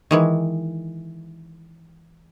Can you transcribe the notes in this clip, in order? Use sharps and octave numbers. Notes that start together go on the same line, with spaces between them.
D#3 E3 G#3